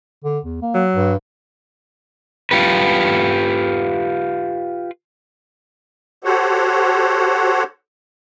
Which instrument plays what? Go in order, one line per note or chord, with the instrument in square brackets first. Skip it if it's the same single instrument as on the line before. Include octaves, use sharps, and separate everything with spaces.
[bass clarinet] D3
E2
A#3
[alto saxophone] F#3
[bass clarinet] G2
[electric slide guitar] F4 G4 B4
[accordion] F#4 G4 A4 C5 C#5 F#5